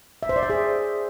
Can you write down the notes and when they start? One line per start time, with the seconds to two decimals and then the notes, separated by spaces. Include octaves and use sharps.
0.23 E5
0.29 C5
0.36 D5
0.43 E5
0.50 G#4